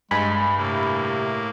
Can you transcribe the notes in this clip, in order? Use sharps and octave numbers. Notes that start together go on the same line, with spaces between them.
G2 G#3 G#5 B5
A2 C3 A#3